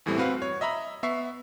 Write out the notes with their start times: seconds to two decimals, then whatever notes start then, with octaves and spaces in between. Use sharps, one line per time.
0.06 E2 A2 E3 G3 A3 C4
0.18 C4 F#4 B4 F5
0.42 C#5
0.61 D#5 E5 A#5 B5
1.03 B3 E5 C#6 C7